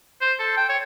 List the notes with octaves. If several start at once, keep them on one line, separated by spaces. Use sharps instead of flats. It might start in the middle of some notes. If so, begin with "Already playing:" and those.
C5
A4
G5
C#5